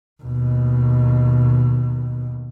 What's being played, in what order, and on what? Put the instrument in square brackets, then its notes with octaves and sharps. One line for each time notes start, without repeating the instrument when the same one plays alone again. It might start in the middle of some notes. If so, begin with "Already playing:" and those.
[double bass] D#2 B2